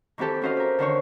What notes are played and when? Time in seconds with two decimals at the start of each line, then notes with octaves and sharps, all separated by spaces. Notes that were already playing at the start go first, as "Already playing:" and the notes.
0.18 D#3 E3 C4 G4 A4
0.42 C#4 F#4 C5 D#5 F5
0.57 G4 A#4
0.79 D3 D#3 C5 C#5